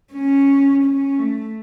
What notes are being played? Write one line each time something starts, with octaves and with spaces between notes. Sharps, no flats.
C#4
C#4
A3